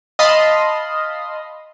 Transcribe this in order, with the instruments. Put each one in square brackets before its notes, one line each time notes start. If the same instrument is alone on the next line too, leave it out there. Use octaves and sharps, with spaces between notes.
[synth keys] D#5 F5 A5 B5 C6 D#6